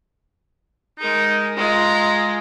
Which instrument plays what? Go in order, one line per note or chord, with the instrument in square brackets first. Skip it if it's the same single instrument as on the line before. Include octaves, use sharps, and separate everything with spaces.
[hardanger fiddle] G#3 A#4 [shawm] D#4
[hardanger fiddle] G#3 F4 [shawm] A#5